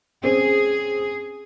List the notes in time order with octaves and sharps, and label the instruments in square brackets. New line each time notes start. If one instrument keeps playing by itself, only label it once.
[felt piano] C4 C#4 C5 [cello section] G#4